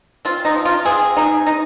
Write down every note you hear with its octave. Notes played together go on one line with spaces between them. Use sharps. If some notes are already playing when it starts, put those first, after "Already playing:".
C4 F4
D#4
F3
F4
C4 G#4
D#4
D#4